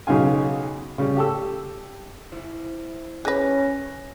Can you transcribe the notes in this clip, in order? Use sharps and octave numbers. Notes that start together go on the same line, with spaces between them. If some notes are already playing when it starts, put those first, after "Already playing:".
B1 C#3 D#4 F5 G#5
C#3 G3
G4 A4 E6
E4 C5
C#4 G#4 B4 F#6 A#6